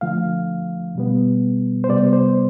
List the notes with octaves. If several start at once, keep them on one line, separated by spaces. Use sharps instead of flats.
D3 F3 A3 F5
B2 G3 B3
C5
C3 G3 B3 D5
C5